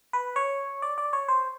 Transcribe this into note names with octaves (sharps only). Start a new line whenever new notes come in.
B4
C#5
D5
D5
C#5
C5